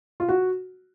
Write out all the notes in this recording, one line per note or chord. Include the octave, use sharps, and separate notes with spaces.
F4
F#4